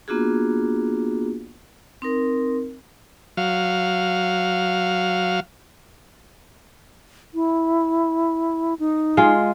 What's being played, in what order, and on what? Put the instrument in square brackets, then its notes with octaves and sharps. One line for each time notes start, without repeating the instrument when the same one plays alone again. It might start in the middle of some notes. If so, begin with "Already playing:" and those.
[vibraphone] A#3 B3 D4 F4 F#4 G#4
C4 D#4 A#4
[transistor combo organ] F#3 F5
[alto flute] E4
D#4
[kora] G#3 F4